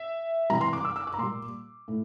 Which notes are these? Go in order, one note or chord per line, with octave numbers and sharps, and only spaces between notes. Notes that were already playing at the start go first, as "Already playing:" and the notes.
Already playing: E5
C3 E3 G3 A#5
C6
D6
E6
E6
D6
A#5
A#2 G3 C6
A2